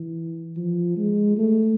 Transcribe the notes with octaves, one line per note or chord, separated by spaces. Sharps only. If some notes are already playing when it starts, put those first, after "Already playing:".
Already playing: E3
F3
G#3
A3